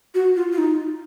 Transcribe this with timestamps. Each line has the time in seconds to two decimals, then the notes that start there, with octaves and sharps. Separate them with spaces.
0.15 F#4
0.36 F4
0.52 F4
0.58 D#4